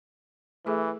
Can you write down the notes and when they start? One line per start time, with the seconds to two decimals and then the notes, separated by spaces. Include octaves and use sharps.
0.66 E3 A3 G#4 A4